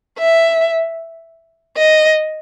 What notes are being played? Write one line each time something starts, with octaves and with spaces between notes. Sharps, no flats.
E5
D#5